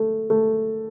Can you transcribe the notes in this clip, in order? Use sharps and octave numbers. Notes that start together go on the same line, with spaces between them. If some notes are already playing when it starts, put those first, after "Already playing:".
Already playing: A3
A3